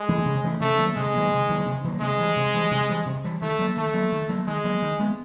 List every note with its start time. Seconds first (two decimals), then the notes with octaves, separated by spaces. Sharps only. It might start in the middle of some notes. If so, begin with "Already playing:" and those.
Already playing: G#3
0.09 E3 A3 C#4
0.26 C3
0.44 E3 A3 C#4
0.60 C3 A3
0.79 D#3 F#3 A#3
0.96 C3 G#3
1.14 D#3 F#3 A#3
1.31 C3
1.49 D#3 F#3 A#3
1.65 C3
1.84 D#3 F#3 A#3
2.01 C3 G#3
2.18 E3 G3
2.36 C3
2.54 E3 G3
2.71 C3
2.89 E3 G3
3.06 C3
3.24 E3 G3
3.41 D#3 A3
3.59 F#3 A#3
3.77 D#3 A3
3.94 F#3 A#3
4.12 D#3
4.29 F#3 A#3
4.47 D#3 G#3
4.64 F#3 A#3
4.82 D#3
5.00 G#3 B3